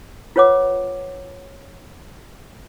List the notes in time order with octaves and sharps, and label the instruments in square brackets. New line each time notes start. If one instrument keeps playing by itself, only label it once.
[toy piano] F4 B4 C#5 F#5 D6